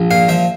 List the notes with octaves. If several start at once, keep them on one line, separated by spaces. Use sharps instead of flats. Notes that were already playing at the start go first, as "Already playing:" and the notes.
Already playing: A#1
A#2 F5
F3 E5